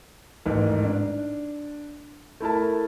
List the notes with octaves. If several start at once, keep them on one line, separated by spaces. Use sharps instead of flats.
A1 G#2 D#3
D4
A3 E4 A#4 A5